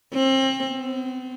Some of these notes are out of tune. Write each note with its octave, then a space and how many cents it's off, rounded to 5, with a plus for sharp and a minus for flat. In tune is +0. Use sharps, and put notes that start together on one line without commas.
C4 +30
C4 -45